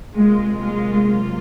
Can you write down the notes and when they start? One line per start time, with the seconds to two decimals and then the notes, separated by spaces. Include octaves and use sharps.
0.16 C3 F#3 G#3 A#3 F4
0.63 G#3